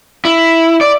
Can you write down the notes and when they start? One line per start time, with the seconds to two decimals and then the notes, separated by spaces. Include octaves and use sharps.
0.25 E4
0.81 D5